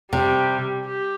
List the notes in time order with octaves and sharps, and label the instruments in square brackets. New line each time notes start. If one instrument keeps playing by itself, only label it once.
[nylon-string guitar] C3 [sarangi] G3
[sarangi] G4